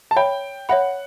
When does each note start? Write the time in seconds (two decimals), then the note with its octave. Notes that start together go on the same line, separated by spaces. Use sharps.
0.11 A5
0.16 C#5 E5 G5 B5
0.69 C#5 E5 F#5 B5